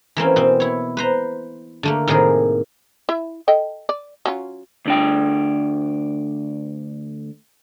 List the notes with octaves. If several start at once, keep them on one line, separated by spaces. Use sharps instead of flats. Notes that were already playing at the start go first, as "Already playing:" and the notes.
E3 A#3 C4 C#4
B2 C4
E4 C#5
B4 C5 A#5
D3 A3 A#3
A2 C3 D#3 A#3 G#4 A#4
E4 E5
A4 D#5 G5
D5
F#3 C#4 F4
D2 D4 G5